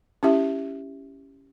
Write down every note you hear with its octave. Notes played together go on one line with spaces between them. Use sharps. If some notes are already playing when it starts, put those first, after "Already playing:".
C#4 E4 G4 E5